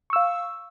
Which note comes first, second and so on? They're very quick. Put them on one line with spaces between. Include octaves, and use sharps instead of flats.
C#6 E6 F5